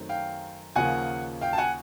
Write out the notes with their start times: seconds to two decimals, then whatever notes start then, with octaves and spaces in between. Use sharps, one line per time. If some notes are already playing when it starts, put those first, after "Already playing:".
Already playing: F#2 D#3 F#3 A3 C4
0.09 F5 G5
0.76 D#2 C#3 F3 A#3 F#5 G#5
1.41 F5 G5
1.53 A5
1.58 F#5 G#5